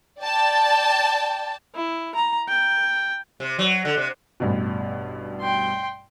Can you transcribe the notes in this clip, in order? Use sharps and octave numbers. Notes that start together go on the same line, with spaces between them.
D5 G5 A5
E4
A#5
G5
C3
F#3
D3
C3
A1 G2 B2
G5 C6